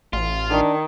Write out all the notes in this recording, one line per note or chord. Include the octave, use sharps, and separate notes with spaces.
A1 F4
D#3 D4